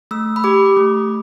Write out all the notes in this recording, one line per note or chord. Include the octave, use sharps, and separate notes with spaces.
A3 E6
B5
G4 D6
A3